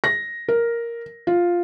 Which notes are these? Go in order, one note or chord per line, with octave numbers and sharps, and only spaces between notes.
A#6
A#4
F4